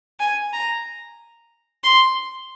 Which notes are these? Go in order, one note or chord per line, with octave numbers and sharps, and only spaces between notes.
G#5
A#5
C6